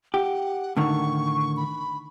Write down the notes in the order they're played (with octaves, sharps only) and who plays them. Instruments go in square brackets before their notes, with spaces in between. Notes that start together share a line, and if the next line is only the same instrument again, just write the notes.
[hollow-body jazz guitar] G4 [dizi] F#5
[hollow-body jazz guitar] A2 D3 D#3 [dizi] C#6
[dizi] B5